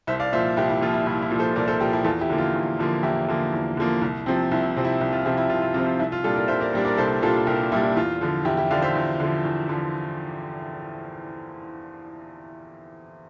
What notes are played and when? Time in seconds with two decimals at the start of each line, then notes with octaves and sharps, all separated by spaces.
0.07 C2 C5 E5
0.20 D5 F5
0.33 A#2 F3 C5 E5
0.57 C2 E4 G4
0.70 E4
0.81 A#2 F3 F4
0.94 E4
1.06 C2 E4
1.22 E4
1.31 A#2 F3
1.39 A4 C5
1.56 C2 A#4 D5
1.68 A4 C5
1.80 A#2 F3 G4 A#4
1.93 E4 G4
2.04 E2 F4 A4
2.21 E4 G4
2.29 D3 F3 A#3
2.38 F4
2.55 E2
2.79 D3 F3 A#3
3.03 E2 E4 G4
3.28 D3 F3 A#3
3.53 E2
3.77 D3 F3 A#3
4.02 C2
4.26 C3 F3 C4
4.51 C2 E4
4.76 C3 F3 C4
4.85 E4
5.01 C2
5.12 F4
5.25 C3 F3 C4 E4 G4
5.37 E4
5.50 C2 F4
5.62 F4
5.74 C3 F3 C4 F4
5.86 F4
5.99 C2 E4
6.12 F4
6.24 A#2 G3 D4 F4 A4
6.36 A#4 D5
6.48 C2 C5 E5
6.61 A#4 D5
6.73 A#2 G3 D4
6.85 A#4 D5
6.97 C2 A4 C5
7.22 A#2 G3 D4 F4 A4
7.47 C2 G4 A#4
7.72 A#2 G3 D4 E4
7.84 E4
7.96 E2 F4
8.21 D3 F3
8.45 E2 E4 G4
8.57 E4 G4
8.71 D3 F3 D5 F5
8.82 C5 E5
8.96 E2
9.20 D3 F3
9.45 E2
9.69 D3 F3